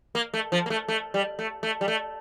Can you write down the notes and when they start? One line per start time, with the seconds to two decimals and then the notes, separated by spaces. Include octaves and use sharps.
0.15 A#3
0.34 A3
0.52 F3
0.66 A#3
0.70 A3
0.88 A3
1.14 G3
1.39 A3
1.63 A3
1.81 G3
1.88 A3